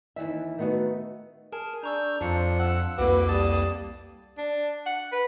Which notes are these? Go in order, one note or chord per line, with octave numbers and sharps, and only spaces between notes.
D#2 D#3 E3 E5
D#3 A3 B3 F#4 D#5
G#4 A#4 A5
D4 A#5 C#6 E6 G6
F2 F3 D4 C5 C#7
F#5 E6
C2 F2 A#3 F#4 B4 D6
G3 A5 D#6
D4
F#5
B4